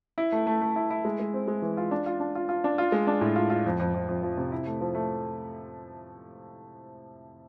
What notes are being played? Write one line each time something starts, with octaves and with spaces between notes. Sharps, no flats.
E4
A3
A3
A3
E4
E4
G#3
G#3
C4
G#3
E3
F4
D4
F4
D4
F4
F4
D4
F4
G#3
D4
A2
F4
F4
F2
F2
F2
F2
F3
C3
E4
A3
F3
A3